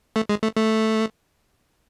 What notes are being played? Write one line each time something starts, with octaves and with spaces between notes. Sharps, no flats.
A3
G#3
A3
A3